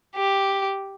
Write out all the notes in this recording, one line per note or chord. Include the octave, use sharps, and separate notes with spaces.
G4